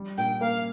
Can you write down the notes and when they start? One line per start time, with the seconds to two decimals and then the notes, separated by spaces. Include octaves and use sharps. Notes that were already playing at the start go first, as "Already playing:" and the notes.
Already playing: G3
0.17 A#2 G5
0.40 A#3 F5